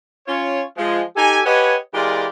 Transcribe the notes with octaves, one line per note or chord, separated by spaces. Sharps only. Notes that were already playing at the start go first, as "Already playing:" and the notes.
C#4 F4 C#5
F3 G#3
D#4 G4 A4 G#5
G4 B4 C#5 D#5 F#5 G#5
E3 G#3 F4 G4 A#4 D5